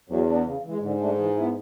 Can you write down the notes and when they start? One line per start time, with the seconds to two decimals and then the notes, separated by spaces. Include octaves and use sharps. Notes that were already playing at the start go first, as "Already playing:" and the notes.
0.09 E2 F#3
0.27 B3 D4
0.45 C#3
0.64 E3 G#3
0.82 G#2 D3
1.00 A3 D4
1.18 E3
1.36 B3 E4